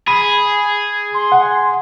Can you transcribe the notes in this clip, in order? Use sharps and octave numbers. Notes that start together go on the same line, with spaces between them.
G#4 B5
C6
F#5